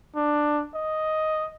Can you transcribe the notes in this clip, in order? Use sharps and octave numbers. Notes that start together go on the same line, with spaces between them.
D4
D#5